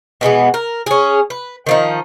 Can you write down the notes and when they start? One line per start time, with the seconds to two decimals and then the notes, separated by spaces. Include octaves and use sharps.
0.21 B2 E3 G#3 B3
0.54 A#4
0.86 C#4 G#4
1.30 B4
1.67 D#3 F3 D#4